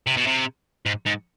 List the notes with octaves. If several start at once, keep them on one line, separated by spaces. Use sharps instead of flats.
C3
B2
C3
G#2
G#2